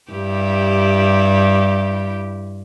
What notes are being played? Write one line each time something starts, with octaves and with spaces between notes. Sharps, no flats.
G2 E4 G4